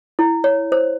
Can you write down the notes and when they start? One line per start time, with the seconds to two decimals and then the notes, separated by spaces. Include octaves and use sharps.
0.19 E4
0.44 C#5
0.72 C5